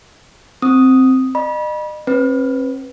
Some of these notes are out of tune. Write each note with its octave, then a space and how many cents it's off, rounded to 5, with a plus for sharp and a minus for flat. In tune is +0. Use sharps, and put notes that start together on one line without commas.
C4 +0 D#6 +0
D#5 -40 B5 -30
C4 +45 B4 +0